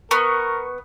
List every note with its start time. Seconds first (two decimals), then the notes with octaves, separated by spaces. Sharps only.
0.11 B3 A#4 C#6